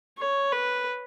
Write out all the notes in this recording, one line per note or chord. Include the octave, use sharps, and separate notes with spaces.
C#5
B4